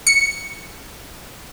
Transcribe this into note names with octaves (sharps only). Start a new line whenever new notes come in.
C#7